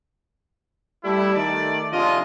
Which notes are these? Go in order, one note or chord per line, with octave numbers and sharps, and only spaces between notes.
G3 A3 E4
D#3 A3 D5
C3 F3 D4 F4 G#4 D#5